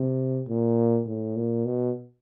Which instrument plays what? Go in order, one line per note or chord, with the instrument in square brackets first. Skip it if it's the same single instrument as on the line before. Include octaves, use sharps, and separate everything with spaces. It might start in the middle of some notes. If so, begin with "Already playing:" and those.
Already playing: [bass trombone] C3
A#2
A2
A#2
B2